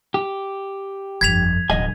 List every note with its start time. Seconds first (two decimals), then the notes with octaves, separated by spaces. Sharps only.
0.14 G4
1.21 G1 F2 G#6 B6 F7
1.70 D1 B2 F#3 D#5 G#5